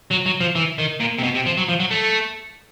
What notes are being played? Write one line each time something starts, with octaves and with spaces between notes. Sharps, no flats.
F#3
F#3
F3
E3
D#3
A#2
C3
B2
C3
F3
F#3
F3
F#3
A3